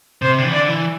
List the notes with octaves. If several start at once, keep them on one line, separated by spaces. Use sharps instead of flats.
C3 C5
D3
E3
D3 D5
E3